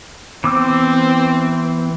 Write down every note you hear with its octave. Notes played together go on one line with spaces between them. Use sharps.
E3 B3 C4 D6 E6